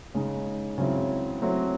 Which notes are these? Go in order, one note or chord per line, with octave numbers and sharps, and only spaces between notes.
C#3 G#3 D#4
C#3 F#3 C4 E4
F#3 A3 C4 E4